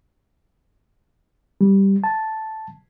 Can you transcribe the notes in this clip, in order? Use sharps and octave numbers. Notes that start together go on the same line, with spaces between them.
G3
A5